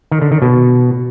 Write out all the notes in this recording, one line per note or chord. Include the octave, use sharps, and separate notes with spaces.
D#3
D3
D#3
B2